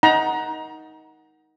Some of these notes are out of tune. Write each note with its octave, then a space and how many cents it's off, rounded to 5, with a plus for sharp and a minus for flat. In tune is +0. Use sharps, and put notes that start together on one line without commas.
D#4 +15 F#5 +5 A#5 +35